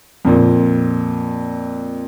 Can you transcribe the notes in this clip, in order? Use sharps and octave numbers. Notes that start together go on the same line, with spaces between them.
F2 A#2